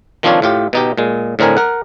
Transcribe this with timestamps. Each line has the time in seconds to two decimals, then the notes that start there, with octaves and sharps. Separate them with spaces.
0.23 D#3 F3 C4 D4 F4 C#5
0.42 A2 F4 G4
0.73 B2 D#4 G4
0.98 A#2 G#3
1.39 A2 D3 C4 A#4 G#5
1.57 A#4 F#5